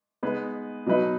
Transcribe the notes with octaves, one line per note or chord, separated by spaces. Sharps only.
G#3 B3 D#4 B4
B2 F#3 D#4 B4